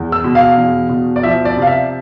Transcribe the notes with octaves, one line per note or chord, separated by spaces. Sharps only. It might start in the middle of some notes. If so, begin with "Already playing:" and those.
Already playing: E2
E6
B2
F5
E2
B2
D5
F3 E5
D5
C3
F5
E5